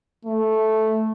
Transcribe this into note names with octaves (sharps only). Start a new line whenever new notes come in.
A3